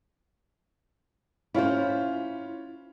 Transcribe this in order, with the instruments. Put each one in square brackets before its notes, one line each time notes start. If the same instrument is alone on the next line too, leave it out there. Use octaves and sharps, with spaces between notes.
[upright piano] C#4 F4 [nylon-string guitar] E4 C5